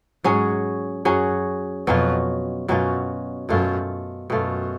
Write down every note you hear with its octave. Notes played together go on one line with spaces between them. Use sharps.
G#2 F#3 C#4 G#4
F#2 F#3 C#4 G#4
F2 B2 F#3 C#4 F4
F#2 B2 F#3 C#4 F4
F#2 B2 A3 F4
F#2 B2 A3 F4